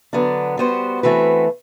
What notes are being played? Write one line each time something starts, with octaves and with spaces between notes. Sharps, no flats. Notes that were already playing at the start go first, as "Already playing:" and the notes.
D3 F#3 B3 D4
G3 B3 F#4 C5
E3 A3 C4 F#4 B4